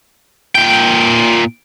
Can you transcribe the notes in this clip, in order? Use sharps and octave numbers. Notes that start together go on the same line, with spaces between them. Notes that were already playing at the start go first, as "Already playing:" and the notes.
A#2 G5